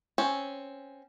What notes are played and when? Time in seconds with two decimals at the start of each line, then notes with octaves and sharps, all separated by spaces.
0.18 C4 C#4